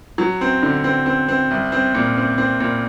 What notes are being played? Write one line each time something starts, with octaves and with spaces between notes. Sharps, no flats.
F#3
C4
D3
C4
C4
C4
C2
C4
A#2
C4
C4
A#2